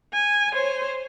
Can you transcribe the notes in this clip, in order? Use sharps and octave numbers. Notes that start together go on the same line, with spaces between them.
G#5
C5 C#5